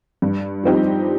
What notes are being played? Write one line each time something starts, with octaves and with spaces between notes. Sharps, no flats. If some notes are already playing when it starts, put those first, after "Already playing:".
G2
F3 C4 D#4 G4